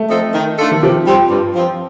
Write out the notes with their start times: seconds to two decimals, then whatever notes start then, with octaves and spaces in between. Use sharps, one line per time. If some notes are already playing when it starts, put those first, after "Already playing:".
Already playing: A3
0.10 F3 C4 D#4 A4
0.34 D#3
0.59 A3 D4 F4 A4
0.71 D#3
0.83 C3 F3
1.07 G3 C4
1.30 G2
1.55 F3 C4